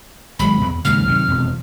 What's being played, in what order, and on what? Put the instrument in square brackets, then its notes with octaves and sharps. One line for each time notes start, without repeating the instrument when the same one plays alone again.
[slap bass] G#1 F#3 G#3 [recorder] B5
[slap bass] E2
[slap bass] D#2 G#2 C#3 [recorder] F6
[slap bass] F#2 C3 D#3
E1 F2